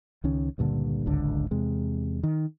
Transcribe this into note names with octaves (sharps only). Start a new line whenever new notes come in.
C#2 D#3 C#4
C#2 G2 A#2 D3
D1 G#1 C#2 D3
E2 C3 G#3
D#3